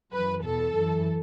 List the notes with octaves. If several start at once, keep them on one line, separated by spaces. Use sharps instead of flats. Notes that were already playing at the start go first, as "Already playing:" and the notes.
F#2 E3 B4
E2 B2 A4
F#2 E3